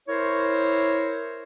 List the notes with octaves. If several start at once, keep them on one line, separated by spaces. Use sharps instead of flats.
E4 A#4 C5 C#5